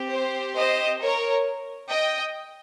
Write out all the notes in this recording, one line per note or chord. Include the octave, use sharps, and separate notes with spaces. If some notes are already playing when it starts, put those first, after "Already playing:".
Already playing: C4 G4
C5
C5 D#5
A#4 C#5
D#5 G5